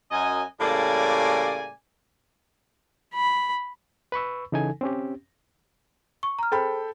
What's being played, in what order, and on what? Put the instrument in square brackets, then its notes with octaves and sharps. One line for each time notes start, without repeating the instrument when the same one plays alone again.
[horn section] F#2 D#5 G#5
A2 C#3 G3 A#3 D5 G#5
[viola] B5
[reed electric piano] B4 B5 C#6 E6
C#3 E3 D#4 A4 G#5
C4 C#4 G4
[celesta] C#6
A#5 F6
[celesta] G#4 C5 [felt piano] A4 G5 B5